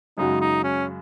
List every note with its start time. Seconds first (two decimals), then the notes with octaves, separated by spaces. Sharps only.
0.18 F#2 C#3 G#3 D#4 F#4
0.41 D#4
0.64 C#4